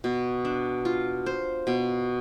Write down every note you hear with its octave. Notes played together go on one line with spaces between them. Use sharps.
B2
D4
F4
C5
B2